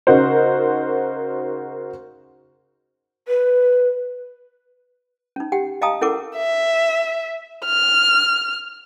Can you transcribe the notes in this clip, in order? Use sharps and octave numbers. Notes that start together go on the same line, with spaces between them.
C#3 D#4 F#4 A#4 C5
B4
C#4 D#4
G4 F#5 G5
D#5 F5 G5 A5 A#5 D#6
C#4 E4 A4 A#4 F#5 D6
E5
F6